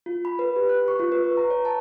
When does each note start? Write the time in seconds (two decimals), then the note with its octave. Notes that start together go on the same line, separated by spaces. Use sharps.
0.06 F4
0.25 B5
0.39 B4
0.56 G4
0.69 F#6
0.88 C#6
0.99 F4
1.12 B4
1.24 C#6
1.37 A#5
1.50 C#5
1.65 A5